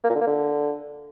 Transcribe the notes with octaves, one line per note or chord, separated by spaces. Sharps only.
A#3
A#2
D3
A#3
D3